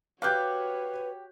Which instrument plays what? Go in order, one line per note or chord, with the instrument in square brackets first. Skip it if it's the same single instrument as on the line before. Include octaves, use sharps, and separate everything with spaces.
[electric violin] F#4 C#5 [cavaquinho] G4 D6 [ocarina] B4 [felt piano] F5 F#6 G6